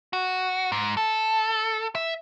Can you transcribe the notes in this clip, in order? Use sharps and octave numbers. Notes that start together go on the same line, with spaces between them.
F#4
G#2
A4
E5